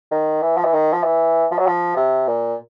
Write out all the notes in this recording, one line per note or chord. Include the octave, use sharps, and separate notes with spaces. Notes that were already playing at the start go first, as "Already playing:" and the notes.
D#3
E3
F3
E3
D#3
F3
E3
F3
F#3
F3
C3
A#2